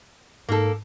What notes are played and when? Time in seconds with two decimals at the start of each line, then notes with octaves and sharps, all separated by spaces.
0.49 G#2 A#3 A4